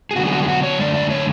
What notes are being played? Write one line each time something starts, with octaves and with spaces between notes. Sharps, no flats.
G#4
D3 F#3 B3 D4 F#4
G#4
F#4
G#4
F#4
C#5
F#2 D3 A3 D4 D5
D5
C#5